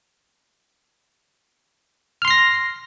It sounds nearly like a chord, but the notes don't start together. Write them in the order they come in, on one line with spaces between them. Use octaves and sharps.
F6 C6 C7 A#6